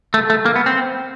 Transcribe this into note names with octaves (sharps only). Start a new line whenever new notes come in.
A3
A3
A#3
B3
C4